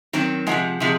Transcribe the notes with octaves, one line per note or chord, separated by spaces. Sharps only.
D#3 F#3 C4
C3 F3 G#3 F#5
C3 F3 G#3